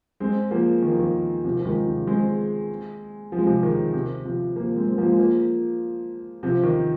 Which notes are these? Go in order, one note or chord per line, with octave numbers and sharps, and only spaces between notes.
G#3 C4
F3 A#3
D#3
F3
D#3
C3 F3
F3
D#3 G#3
C3 F3
G#3 C4
F3
G#3
C3 F3
D#3
C3
C3 F3
F3 A#3
G#3 C4
G#3
F3 A#3
G#3
F3 A#3
C3 F3
D#3